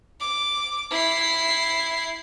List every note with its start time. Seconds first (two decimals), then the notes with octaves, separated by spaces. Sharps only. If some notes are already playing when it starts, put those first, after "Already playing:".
0.21 D6
0.90 E4 C7